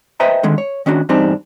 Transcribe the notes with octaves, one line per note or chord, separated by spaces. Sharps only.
B4 C5 D#5 E5 G5 A#5
D3 D#3 G#3
C#5
D#3 C#4 D4 F#4
E2 G2 G3 C4 D4 D#4